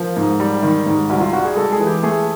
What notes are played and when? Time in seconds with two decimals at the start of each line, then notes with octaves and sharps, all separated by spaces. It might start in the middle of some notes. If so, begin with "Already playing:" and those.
Already playing: F3 A#4
0.16 G#2
0.40 G3
0.63 D#3
0.86 G#2
1.10 C2 F#4
1.20 F4
1.33 G3 F#4
1.45 G#4
1.56 G#3 A4
1.72 G#4
1.79 E3
1.87 G4
2.03 A3 G#4